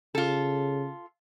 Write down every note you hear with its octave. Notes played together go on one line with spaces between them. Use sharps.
C#3 F4 A4